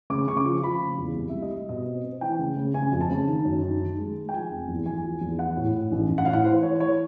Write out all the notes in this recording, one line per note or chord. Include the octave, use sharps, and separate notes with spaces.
C#3 D6
C#3 C#6
D6
F3
F3 B5
C#3
E2
C2
E5
G3
D#5
G3
B2 D#5
C4
C4
E3 G5
C#3
C#3
C#3 G#5
F2
A5
C#3
D#3
F#2
D#3
D#3
G#3
G#3
G5
F3 G#5
F1
E2
E2 G#5
F3
E2
E3 F#5
A2
A2
A1
A1
F#5
A2 F5
F#5
E3 C5
E3 C#5
E3 C#5